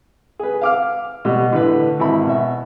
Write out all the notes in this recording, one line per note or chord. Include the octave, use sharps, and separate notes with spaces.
G#4 B4
F5 D6 F6
B2 G3 D#5
A2 D3 B4
G#1 E4 B5
B2 E5